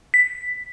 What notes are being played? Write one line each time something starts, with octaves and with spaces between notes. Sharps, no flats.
B6